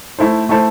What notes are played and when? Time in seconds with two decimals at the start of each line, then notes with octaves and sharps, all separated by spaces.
0.19 A3 E4 A4 C5
0.49 A3 E4 A4 C5